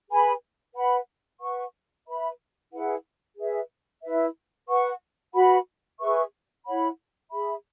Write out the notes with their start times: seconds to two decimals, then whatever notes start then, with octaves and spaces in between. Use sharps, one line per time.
0.09 G#4 B4 G#5 B5
0.75 B4 F#5 B5
1.41 B4 F#5 C#6
2.06 B4 E5 B5
2.71 E4 G#4 B4 F#5
3.36 G#4 B4 E5
4.03 E4 B4 E5
4.68 B4 F#5 C#6
5.34 F#4 B4 F#5 B5
5.99 G#4 B4 E5 C#6
6.65 E4 C#5 F#5 B5
7.30 G#4 E5 B5